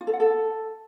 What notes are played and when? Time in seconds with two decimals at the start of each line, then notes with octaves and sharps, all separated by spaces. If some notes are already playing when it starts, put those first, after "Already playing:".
0.01 F4
0.07 A4
0.13 F#5
0.20 A4